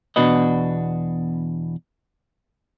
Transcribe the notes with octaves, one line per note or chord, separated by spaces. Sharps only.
E2 B2 D4 F#4 B4 D#5